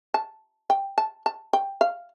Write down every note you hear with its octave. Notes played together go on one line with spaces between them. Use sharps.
A5
G5
A5
A5
G5
F5